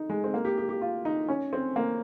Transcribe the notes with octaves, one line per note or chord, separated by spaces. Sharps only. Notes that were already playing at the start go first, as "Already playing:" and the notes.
Already playing: D#4
G#3
C4
A#3
G4
G4
G4
F4
D#4
C#4
C4
A#3